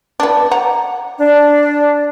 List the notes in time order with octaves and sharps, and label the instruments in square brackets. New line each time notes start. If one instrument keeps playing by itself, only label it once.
[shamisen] B3 D4
F#5 A#5
[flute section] D4